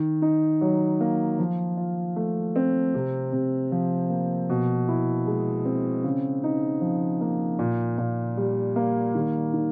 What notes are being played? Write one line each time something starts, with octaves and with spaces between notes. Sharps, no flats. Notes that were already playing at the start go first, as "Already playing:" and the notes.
Already playing: D#3
D#4
F#3
A#3
F3
F4
A3
C4
C3
C3
F3
A#3
B2
E4
G#3
C4
C#3
D#4
F3
A#3
A#2
A#2
G3
A#3
D#3
D#3